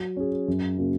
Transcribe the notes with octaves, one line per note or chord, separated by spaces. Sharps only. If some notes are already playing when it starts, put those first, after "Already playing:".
Already playing: F#3
C#4 G#4
F#2
C#3 F#3 A#3